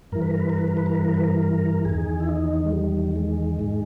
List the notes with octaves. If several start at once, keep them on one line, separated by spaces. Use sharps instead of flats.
G2 E3 A#4
B4
A#4
B4
A#4
B4
A#4
B4
A#4
B4
A#4
B4
A#4
E2 D#3 G#4
E4
D#4
G#3
G3
G#3
G#2 D#3